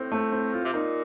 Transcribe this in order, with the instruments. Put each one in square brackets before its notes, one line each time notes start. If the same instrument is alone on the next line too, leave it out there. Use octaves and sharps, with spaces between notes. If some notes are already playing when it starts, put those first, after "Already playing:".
Already playing: [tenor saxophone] A2 [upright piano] C4
[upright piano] A3
C4
F4
[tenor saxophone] C3
[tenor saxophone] A#2 [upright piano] D#4